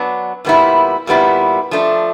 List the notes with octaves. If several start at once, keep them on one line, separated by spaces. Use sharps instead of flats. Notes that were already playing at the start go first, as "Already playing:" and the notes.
Already playing: F#3 B3 D4
A#2 G3 B3 E4
A#2 G3 B3 E4
F3 A3 D4